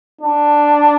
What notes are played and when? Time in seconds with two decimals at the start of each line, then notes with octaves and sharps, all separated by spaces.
0.21 D4